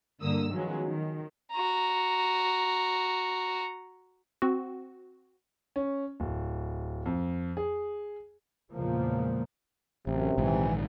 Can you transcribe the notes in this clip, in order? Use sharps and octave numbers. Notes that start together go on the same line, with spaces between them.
G2 D3 A#3 D#6 E6
D#3 F3 F#3 G#3 B3 C#4
D#3
F#4 A#5
C4 F#4
C#4
D1
F2
G#4
E2 A#2 C#3 F3 G#3 A#3
A1 F#2 C3
A#1 G#2 D#3 E3